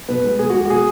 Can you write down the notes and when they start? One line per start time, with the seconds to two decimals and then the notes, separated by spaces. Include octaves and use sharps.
0.09 B2 B4
0.24 G#3
0.39 B2 G#4
0.50 F#4
0.54 G#3
0.59 G#4
0.65 F#4
0.70 B2 G#4